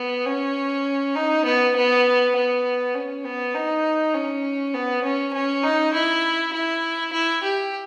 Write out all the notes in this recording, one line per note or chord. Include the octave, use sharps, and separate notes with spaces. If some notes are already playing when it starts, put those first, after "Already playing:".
Already playing: B3
C#4
D#4
B3
B3
B3
C#4
B3
D#4
C#4
B3
C#4
C#4
D#4
E4
E4
E4
G4